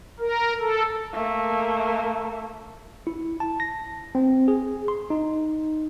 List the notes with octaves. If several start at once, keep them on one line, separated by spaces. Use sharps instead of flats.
A#4
A4
A3 A#3
E4
A5
A#6
C4
G#4
C6
D#4